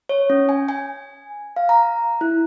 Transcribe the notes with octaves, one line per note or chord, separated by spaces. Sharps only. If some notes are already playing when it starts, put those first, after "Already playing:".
C#5
C#4
G#5
G#5
F5
A#5
E4